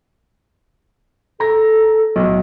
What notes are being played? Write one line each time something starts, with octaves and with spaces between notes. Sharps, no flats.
A4 A#5 A#6
B1 A2